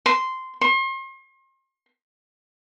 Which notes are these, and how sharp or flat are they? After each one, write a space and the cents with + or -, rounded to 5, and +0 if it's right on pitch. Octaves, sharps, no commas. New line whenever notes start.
C6 -10
C6 +40